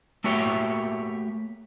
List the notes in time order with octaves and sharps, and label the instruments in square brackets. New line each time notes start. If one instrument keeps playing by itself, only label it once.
[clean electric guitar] A3 A#3 F#4 G4 C#5 E5